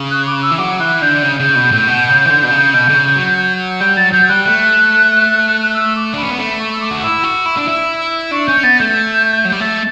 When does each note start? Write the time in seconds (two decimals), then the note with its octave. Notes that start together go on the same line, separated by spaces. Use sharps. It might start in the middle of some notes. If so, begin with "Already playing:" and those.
Already playing: C#3
0.11 F#6
0.27 D6
0.42 E6
0.51 E3
0.58 F#3 D6
0.80 E3 F#6
1.02 D3 G6
1.22 C#3 G6
1.39 C#3
1.55 B2
1.71 A2
1.87 B2
2.09 C#3
2.25 E3
2.30 D3
2.43 B2
2.51 C#3
2.74 B2
2.88 D3
2.94 C#3
3.16 F#3
3.80 G3 G6
3.97 F#3 A6
4.13 F#3 G6
4.29 G3 F#6
4.44 A3 F#6
5.63 F#6
5.74 E6
5.96 D6
6.14 D4
6.17 C#4 B5
6.30 B3
6.38 A3 B5
6.59 C#6
6.73 E6
6.81 D6
6.91 F#4
7.03 E4 E6
7.23 F#4
7.46 E4
7.57 D4
7.68 E4
8.31 D4 C#6
8.47 C#4 G6
8.63 B3 A6
8.80 A3 G6
9.45 F#3
9.52 G3
9.60 A3 A6